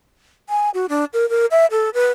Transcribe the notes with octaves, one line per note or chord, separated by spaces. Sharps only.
G#5
F#4
D4
A#4
A#4
E5
A4
B4